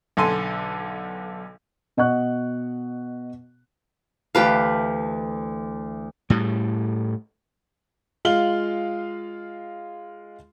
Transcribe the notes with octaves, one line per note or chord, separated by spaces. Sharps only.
B1 D3 A4 G#5 C6
B2 D#5 F#5 C#6 F#6
D2 E3 G4 B4 F5 A5
A2 G3
G#3 F4 F5 F#7 G7